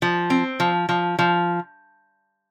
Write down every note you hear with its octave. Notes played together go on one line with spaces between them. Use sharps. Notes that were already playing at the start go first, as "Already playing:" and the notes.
F3
C4
F3
F3
F3